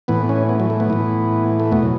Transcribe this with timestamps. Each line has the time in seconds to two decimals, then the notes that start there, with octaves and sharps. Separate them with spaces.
0.08 A2 E3 B3
0.29 C#4
0.49 B3
0.60 F#3
0.70 A3
0.80 B3
0.90 A2 E3
1.60 A3
1.71 E2 B2 B3
1.83 F#3